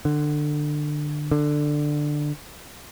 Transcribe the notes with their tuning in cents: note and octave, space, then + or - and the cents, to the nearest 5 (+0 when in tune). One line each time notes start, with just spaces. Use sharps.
D3 +20
D3 +10